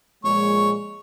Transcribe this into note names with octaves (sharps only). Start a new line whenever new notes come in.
A#2 F3 G#3 C#5